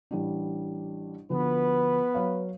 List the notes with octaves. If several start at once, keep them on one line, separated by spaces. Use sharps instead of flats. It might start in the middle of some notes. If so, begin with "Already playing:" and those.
A1 G3 D4
D2 F3 B3 B4
F#3 C#5 F5